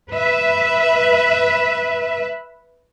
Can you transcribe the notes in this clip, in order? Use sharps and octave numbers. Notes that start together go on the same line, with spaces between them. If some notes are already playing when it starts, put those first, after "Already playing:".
B4 E5